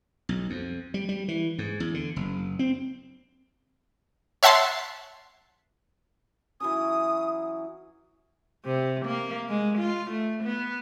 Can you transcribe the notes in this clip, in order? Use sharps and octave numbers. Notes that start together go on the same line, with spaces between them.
B1
F2
G3
G3
E3
G#2
E2
D3
F#1
C4
C#5 E5 F#5 A5 C6
E3 F#3 C#4 D#6
C3
A#3
G#3
F4
A3
B3